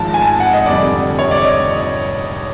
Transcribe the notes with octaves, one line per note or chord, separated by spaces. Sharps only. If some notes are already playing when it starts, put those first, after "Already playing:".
Already playing: G#1 G#2 F3 A5
G#5
A5
G#5
F#5
D#5
F1 F2 D3 G3 D5
C#5
D5
D#5